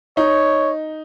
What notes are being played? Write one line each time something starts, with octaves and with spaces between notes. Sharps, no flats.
D#4 C#5